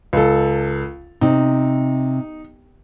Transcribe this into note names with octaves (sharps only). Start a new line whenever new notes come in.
C#2 A4
C3 D#4